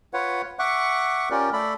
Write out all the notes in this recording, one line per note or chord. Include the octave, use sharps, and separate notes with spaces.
F4 B4 C#5 F#5
E5 F#5 C#6 D6 F#6
C#4 F4 G4 A#4 D5
A3 A4 D5 B5